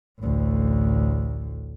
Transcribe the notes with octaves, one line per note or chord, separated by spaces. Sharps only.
A1 D2